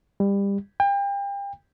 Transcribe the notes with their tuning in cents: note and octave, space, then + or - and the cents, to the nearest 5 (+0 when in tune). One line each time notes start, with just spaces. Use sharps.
G3 +25
G5 +35